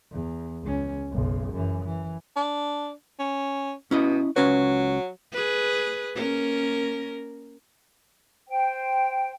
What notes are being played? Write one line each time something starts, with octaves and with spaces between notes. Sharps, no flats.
E2
C#2 C#4
F#1 B1
F#2 E3
E3
D4
C#4
B2 C#4 E4 D#5
C#2 F#3 C#4 B4
G#4 B4
A#3 C#4 A#4
C5 G5